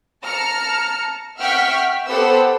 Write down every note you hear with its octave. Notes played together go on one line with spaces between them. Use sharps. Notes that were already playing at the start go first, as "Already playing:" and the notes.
A5 A#5 F6 C#7
E5 F#5 G5 C#6 F6 B6
B3 G4 A4 C5 F#5 E6